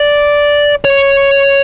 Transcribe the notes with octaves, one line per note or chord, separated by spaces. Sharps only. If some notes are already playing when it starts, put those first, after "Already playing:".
Already playing: D5
C#5